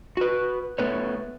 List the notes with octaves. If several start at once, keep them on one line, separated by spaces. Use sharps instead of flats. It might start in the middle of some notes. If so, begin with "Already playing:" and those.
F#4 B4
A3 B3 B4 C#5